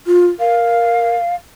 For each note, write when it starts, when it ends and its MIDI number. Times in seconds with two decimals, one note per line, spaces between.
0.07 0.27 65
0.39 1.15 70
0.39 1.35 77